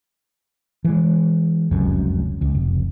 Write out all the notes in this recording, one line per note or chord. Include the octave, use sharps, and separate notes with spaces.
E3 G#3
F1 C#2 F#2
C#2
F1